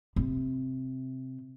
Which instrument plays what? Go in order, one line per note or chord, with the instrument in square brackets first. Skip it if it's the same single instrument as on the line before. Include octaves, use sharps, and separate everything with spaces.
[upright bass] C3